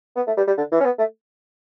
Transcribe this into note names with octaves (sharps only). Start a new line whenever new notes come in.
B3
A3
G3
G3
D3
E3
C#4
B3
A3